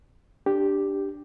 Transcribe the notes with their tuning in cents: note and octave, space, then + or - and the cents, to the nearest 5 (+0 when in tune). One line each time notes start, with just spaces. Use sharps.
D4 +0 G4 +0